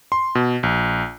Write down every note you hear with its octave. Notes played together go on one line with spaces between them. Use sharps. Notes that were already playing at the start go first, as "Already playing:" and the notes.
C6
B2
A#1